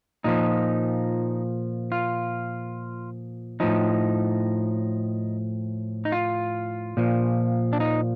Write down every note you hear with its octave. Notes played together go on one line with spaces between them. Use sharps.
A#2 F3 D#4
F4
A2 F3 D#4
D#4
F4
A#2 F3
D4
D#4